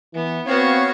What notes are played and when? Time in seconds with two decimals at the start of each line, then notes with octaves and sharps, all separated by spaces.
0.14 E3 B3
0.47 B3 C4 F#4 C#5 F5